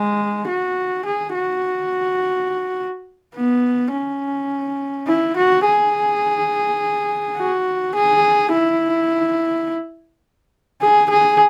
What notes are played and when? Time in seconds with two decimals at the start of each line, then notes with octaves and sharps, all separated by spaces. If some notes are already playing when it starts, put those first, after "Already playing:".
Already playing: G#3
0.48 F#4
1.06 G#4
1.35 F#4
3.36 B3
3.93 C#4
5.07 E4
5.37 F#4
5.66 G#4
7.38 F#4
7.95 G#4
8.52 E4
10.82 G#4
11.10 G#4